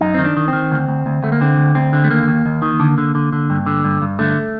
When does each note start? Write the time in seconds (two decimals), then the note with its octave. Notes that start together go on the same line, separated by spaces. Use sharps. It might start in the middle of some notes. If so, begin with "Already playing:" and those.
0.01 F#2 D#4
0.14 D#3 C4
0.25 D4
0.37 D#3
0.48 C4
0.53 D#3
0.71 D2
0.88 D2
1.06 D2
1.23 D2 A3
1.32 A#3
1.41 D3 C4
1.57 D2
1.75 D2 C4
1.93 D3
2.04 A3
2.10 D#2 A#3
2.28 D#2
2.46 D#2
2.62 D#3
2.80 D3
2.98 D3
3.15 D3
3.33 D3
3.50 G2
3.66 D3
3.84 G2
4.02 G2
4.19 D3 A3